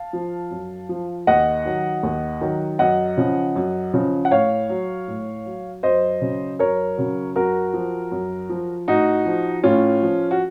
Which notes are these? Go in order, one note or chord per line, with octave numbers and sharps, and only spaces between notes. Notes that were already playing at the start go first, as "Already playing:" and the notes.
Already playing: F5 A5
F3
F#2
F3
D#2 D#5 F#5
D#3 F#3
D#2
D#3 F#3
F#2 D#5 F#5
C#3 F3
F#2
C#3 F3
F#5
A2 C#5 F5
F#3
A2
F#3
F#2 C5 D#5
C#3 F#3
F#2 A#4 C#5
C#3 F#3
F#2 F#4 A#4
F3
F#2
F3
A2 D#4 F#4
F3
A2 C#4 F4
F3
F#4